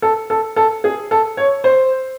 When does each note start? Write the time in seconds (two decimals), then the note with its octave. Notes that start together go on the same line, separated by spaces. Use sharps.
0.02 A4
0.30 A4
0.56 A4
0.84 G#4
1.11 A4
1.37 C#5
1.64 C5